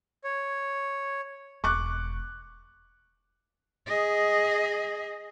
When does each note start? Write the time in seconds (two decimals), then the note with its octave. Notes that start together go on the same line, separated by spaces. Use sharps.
0.24 C#5
1.64 E1 C#6 D6 F#6
3.87 G#4 D#5